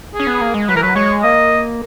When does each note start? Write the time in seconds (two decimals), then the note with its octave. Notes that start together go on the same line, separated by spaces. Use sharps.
0.14 G#4
0.20 C#4
0.27 B3
0.41 A#3
0.54 G#3
0.69 F#3 B4
0.75 E3 A#4
0.82 F#3 B4
0.95 G#3 C#5
1.23 A#3 D#5